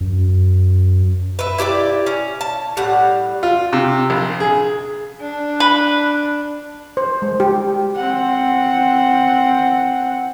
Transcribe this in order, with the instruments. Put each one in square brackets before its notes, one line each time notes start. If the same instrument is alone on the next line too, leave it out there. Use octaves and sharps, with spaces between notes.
[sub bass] F#2
[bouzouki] B4 E5
E4 G4 B4 D5
C#4
A5
A2 G3 F#5
[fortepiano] F4
C3
A#1
G#4
[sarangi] D4
[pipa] B4
[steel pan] C5
G#3
G4
[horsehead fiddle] C4 F#5